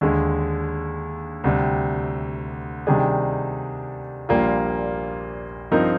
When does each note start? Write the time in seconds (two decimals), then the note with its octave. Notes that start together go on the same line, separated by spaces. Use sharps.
0.01 D#2 D3 G#3
1.44 D2 C3 G3
2.87 C3 D#3 G3 D4 G#4
4.29 A#1 A#2 G3 A#3 F4
5.71 G2 F3 C4 D#4 A#4